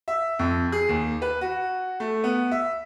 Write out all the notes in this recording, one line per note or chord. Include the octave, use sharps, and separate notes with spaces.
E5
F2
G#4
D#2
B4
F#4
A3
B3
E5